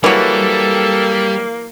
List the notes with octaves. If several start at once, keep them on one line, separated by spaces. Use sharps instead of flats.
E3 F#3 G3 A#3 A4